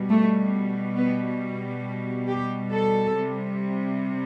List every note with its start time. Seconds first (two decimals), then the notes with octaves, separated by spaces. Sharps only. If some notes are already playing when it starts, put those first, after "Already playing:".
Already playing: B2 G3
0.09 A3
0.97 B3
2.28 G4
2.72 A4
3.16 C3 G3